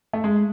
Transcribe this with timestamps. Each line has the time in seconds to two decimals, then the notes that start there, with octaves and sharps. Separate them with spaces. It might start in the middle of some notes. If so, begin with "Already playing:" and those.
0.13 A3
0.24 G#3